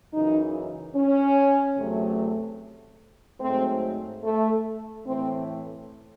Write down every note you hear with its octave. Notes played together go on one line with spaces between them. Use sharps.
F#2 C#3 E3 D#4
C#4
E2 C3 F#3 A3
G#2 F#3 A3 C4
A3
A2 E3 A3 C4